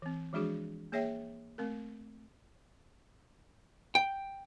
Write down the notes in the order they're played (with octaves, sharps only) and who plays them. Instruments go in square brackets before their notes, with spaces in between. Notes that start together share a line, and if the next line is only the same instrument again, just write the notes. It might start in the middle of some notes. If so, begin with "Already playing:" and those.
[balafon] E3 C4
E3 F3 G#3 D4 F#4 G#4
A#3 G#4 C#5 E5 G5
A3 C4 A#4
[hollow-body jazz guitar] G5